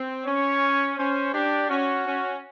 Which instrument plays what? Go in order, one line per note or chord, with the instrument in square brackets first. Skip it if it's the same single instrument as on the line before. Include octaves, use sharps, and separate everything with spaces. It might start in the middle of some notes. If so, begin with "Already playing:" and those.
Already playing: [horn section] C4
[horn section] C#4 [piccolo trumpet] C#5
[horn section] C#4 [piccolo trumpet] C5
[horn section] D4 [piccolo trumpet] G4
[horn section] C#4 [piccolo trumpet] F#4
[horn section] C#4